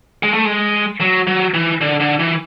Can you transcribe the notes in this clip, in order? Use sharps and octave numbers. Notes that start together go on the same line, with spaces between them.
G#3
A3
G#3
F#3
F#3
E3
D3
D3
E3